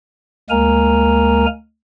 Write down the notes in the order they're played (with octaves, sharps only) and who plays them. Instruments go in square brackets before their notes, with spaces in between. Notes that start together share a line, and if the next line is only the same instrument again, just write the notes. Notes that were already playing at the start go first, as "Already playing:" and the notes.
[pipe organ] D2 G#3 A#3 A#4 G#5 A#5